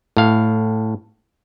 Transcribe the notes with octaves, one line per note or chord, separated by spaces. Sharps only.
A2 F5